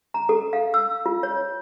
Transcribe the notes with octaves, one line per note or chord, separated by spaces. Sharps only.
A#5
A4
F5
E6
F4
C#5